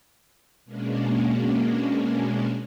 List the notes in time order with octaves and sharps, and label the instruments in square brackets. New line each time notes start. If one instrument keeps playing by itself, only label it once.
[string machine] B2 G#3 A#3 C#4 D4